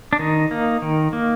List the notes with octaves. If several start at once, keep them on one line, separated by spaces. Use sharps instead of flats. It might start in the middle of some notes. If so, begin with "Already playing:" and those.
D4
D#3 D#4
A#3
D#3
A#3